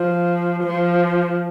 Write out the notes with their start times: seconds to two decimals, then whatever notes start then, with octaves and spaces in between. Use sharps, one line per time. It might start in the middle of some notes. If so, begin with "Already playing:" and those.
Already playing: F3
0.63 F3